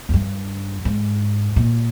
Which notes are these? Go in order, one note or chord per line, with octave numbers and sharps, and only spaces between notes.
F2
G2
G#2
A#2